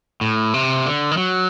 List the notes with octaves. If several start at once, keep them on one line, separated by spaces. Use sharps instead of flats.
A2
C3
D3
D#3
F#3